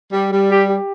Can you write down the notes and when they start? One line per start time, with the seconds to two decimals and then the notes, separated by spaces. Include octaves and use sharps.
0.12 G3
0.31 G3
0.50 G4
0.68 G4